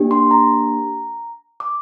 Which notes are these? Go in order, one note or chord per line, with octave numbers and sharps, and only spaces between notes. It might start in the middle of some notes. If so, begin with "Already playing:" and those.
Already playing: A#3 D4 G4
C6
A#5
D6